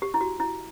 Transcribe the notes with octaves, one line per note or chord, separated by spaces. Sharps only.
G4
E4
F#4
E4